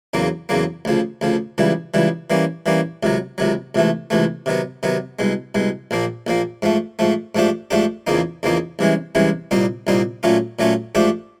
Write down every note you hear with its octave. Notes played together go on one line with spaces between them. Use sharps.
E2 C#3 F#3 A#3
E2 C#3 F#3 A#3
D2 C#3 F3
D2 C#3 F3
C#2 C#3 E3 G3
C#2 C#3 E3 G3
E3 G3 A#3 C#4
E3 G3 A#3 C#4
C#2 C3 D#3 F#3
C#2 C3 D#3 F#3
C#2 C3 E3 A3
C#2 C3 E3 A3
C3 D#3 F#3 B3
C3 D#3 F#3 B3
C2 B2 G#3
C2 B2 G#3
A#1 A#2 F3 A#3
A#1 A#2 F3 A#3
G#2 F3 A3
G#2 F3 A3
G#2 F3 A3 D4 G4
G#2 F3 A3 D4 G4
E2 C#3 F3 A#3 D#4
E2 C#3 F3 A#3 D#4
C2 C3 E3 G#3 C#4
C2 C3 E3 G#3 C#4
C2 A#2 G3 C4 D#4
C2 A#2 G3 C4 D#4
A#2 F#3 A3 C#4 F4
A#2 F#3 A3 C#4 F4
G#2 F3 A3 D4 G4